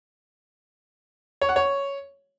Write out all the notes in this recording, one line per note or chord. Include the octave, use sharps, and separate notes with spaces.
C#5
F#5
C#5